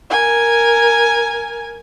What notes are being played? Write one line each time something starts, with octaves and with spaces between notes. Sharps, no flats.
A#4 G#5